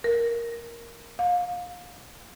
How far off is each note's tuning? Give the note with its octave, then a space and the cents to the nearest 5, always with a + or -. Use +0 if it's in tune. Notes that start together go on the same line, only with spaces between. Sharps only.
A#4 +5
F5 +30